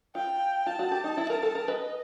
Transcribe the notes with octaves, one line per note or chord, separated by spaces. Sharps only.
F4 G5
F4 A5
F#4
G4
D#4
E4
A#4
A4
A#4
B4 D#5